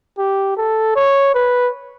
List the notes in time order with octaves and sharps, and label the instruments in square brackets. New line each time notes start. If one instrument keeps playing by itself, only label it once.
[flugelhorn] G4
A4
C#5
B4